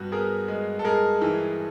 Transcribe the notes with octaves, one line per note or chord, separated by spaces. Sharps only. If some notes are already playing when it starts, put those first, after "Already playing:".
Already playing: G2 B3 F#4
B3 G#4 A#4
G#3
A4
G#3 G#4 A#4
E3